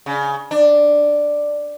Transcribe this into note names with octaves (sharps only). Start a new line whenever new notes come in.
C#3
D4